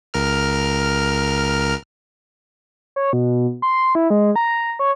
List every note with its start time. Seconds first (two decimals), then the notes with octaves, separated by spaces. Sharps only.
0.14 C#2 A#4 F6
2.96 C#5
3.13 B2
3.62 C6
3.95 E4
4.10 G#3
4.36 A#5
4.79 C#5